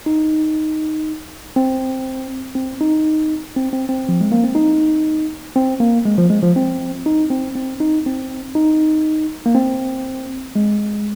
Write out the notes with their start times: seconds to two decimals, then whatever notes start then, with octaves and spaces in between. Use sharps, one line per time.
0.06 D#4
1.56 C4
2.55 C4
2.81 D#4
3.56 C4
3.73 C4
3.89 C4
4.09 F3
4.21 G#3
4.32 A#3
4.44 C4
4.55 D#4
5.56 C4
5.80 A#3
6.05 G#3
6.18 F3
6.30 G#3
6.43 F3
6.56 C4
7.06 D#4
7.30 C4
7.55 C4
7.80 D#4
8.06 C4
8.55 D#4
9.46 A#3
9.55 C4
10.56 G#3